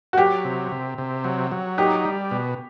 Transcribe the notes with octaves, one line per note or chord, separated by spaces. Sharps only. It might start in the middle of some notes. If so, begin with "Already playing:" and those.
F#4
F#3 G4
C3
C3
C3
F#3
F#3
D#4 G4
G3
B2